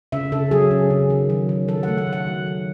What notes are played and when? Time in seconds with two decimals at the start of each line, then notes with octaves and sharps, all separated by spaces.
0.12 C#3 E5
0.32 C#3 A4
0.51 F#3 G#4
0.71 C#3
0.90 C#3
1.10 D#3
1.30 F#3
1.49 D#3
1.68 F#3 A4
1.83 A3 F#5
1.98 F#5
2.07 D#3
2.13 F#5
2.27 F#3
2.46 D#3